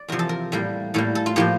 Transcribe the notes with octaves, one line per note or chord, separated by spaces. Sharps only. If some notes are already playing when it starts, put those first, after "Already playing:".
Already playing: D5
E2 C3 F3 A#4
A4
A#4
A2 G3 A#3
A2 G3 A#3 A4
A4
F4
A2 F3 A#3 G4